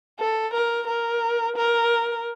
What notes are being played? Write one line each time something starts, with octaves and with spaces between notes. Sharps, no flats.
A4
A#4
A#4
A#4